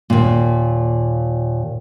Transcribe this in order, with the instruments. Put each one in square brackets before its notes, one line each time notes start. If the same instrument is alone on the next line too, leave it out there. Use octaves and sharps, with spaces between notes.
[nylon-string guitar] D#2 A#2